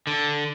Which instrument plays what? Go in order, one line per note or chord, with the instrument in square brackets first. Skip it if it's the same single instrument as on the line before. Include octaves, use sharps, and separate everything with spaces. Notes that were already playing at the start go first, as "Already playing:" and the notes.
[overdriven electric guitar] D3